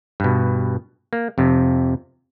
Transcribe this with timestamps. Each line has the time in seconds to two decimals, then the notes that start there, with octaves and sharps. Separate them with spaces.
0.20 G2 B2
1.13 A#3
1.38 F2 C3